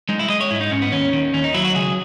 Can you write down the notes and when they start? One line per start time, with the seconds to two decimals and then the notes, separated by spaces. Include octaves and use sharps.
0.09 G#3 D#4
0.19 E4
0.29 G#3 D#5
0.41 C#5
0.51 G#2 E4
0.61 D#4
0.71 G#2 C#4
0.82 B3
0.92 D#2 C#4
1.13 D#3
1.33 D#2 C#4
1.44 D#4
1.54 F#3 E4
1.65 F#4
1.74 C#2 G#4